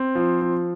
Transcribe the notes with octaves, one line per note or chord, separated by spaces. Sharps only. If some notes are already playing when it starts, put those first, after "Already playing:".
Already playing: C4
F3
F3